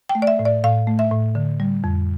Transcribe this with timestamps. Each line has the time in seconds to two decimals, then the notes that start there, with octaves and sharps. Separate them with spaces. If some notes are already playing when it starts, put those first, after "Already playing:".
0.09 G5
0.15 A3
0.22 D5
0.27 E5
0.39 A2
0.45 D5
0.64 A2 F5
0.87 A3
0.99 E5
1.11 A2
1.35 D3
1.60 G3
1.84 F2